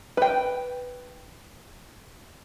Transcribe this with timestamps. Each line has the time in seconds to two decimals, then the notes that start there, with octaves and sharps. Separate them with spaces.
0.17 B4 G5